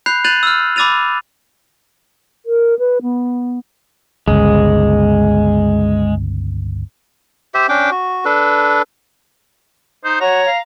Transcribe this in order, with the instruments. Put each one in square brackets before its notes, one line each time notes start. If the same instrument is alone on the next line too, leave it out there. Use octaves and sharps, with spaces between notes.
[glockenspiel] B5 F#6 G6 C7 F7
F#6 G6 A6 D#7 F7 F#7
E6 F6
B5 D6 E6 A6 D#7 F7
[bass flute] A#4
B4
B3
[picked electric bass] G1 C#2 [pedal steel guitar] G#3
[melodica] G4 C5 E5
C#4 D4 G5 D6
F#4
D4 A4 B4
[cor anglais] D#4 [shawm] C5
[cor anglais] F#4 [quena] C#5 [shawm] A#5
[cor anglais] F5